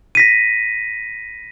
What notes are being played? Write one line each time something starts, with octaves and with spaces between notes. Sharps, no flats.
A#6 B6 D#7